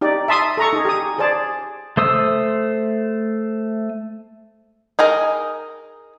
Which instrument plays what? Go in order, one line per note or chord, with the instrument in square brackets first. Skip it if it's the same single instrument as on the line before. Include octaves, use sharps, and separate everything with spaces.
[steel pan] D#4 G4 D5
E5 A5 C6 D#6
A4 A#5 C#6
D#4 G#4
G4 D#6
G#4 C5 D5 A5
[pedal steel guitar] A3 C5 D#6 E6
[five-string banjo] D#4 G#4 A#4